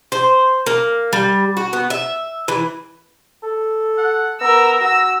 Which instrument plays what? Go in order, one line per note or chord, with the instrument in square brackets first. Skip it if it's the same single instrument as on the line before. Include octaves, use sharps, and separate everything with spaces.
[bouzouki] C5
A#3
G3
F#4
B3
E5
E3
[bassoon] A4
[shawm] F#5
[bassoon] B3 [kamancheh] A#4 E6 [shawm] A#5
[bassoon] F#4 [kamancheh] E6